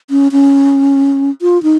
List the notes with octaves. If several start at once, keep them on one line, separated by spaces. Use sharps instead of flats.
C#4
C#4
F4
D#4